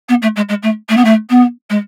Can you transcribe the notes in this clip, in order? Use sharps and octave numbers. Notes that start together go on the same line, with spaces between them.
B3
A3
G#3
G#3
A3
A3
B3
A3
B3
G#3